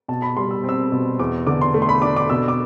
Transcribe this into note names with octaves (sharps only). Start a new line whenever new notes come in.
B2 A5
B5
G3 C6
E6
C4 E6
B2
E2 D6
D3 D6
C6
A3
C6
B5
D4 D6
D6
B2 E6
D6